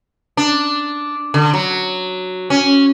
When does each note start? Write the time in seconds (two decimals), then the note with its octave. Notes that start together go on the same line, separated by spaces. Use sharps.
0.37 D4
1.34 D3
1.54 F#3
2.50 C#4